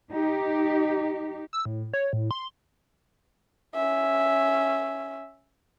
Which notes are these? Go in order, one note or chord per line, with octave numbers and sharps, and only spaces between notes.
D#4 G4
E6
A2
C#5
A2
C6
C#4 E5